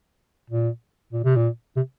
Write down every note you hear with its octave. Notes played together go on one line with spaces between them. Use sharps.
A#2
A#2
C3
A#2
C3